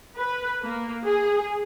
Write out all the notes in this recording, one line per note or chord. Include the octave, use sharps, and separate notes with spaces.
B4
A#3
G#4